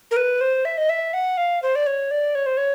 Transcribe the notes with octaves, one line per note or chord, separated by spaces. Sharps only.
A#4
B4
C5
E5
D#5
E5
F#5
F5
C5
D5
C#5
D5
C#5
C5
C#5